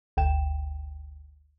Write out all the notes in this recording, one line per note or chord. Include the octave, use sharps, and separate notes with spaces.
G1 D2 G5 E7